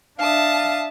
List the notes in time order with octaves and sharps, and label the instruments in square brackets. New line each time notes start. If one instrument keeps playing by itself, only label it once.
[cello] D4 E5 [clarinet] F5 [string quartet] A5 D#6